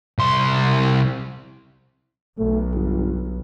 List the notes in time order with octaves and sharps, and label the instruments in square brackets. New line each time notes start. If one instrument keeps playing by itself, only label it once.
[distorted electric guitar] C2 C6
[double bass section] B1 [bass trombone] A3
[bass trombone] G1